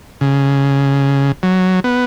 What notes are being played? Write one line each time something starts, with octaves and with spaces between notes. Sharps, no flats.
C#3
F#3
B3